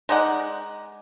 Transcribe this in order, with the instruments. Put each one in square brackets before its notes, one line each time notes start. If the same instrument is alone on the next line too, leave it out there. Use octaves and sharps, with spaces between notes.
[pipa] G#3 D#4 D5 F#5